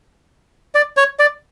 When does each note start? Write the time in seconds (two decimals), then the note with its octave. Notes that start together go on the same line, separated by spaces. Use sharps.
0.75 D5
0.97 C#5
1.19 D5